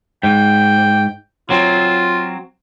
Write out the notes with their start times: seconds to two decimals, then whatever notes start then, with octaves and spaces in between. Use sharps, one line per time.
0.23 G#2 G5
1.50 F#3 C4 F4